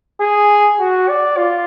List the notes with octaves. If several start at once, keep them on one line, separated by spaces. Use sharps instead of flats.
G#4
F#4
D5
F4